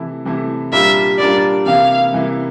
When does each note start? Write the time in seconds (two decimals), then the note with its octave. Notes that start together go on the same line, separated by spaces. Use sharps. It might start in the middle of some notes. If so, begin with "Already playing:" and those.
Already playing: C3 E3 A3 E4
0.25 C3 E3 A3 E4
0.72 A#2 G3 D4 F4 A#4 E5
1.19 A#2 G3 D4 F4 A#4 D5
1.66 C3 E3 A#3 E4 F5
2.13 C3 E3 A#3 E4